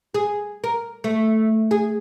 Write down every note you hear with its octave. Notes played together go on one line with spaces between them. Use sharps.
G#4
A#4
A3
G#4